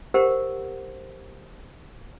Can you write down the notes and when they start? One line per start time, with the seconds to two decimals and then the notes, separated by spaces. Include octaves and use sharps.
0.14 G4 A#4 C5 F#5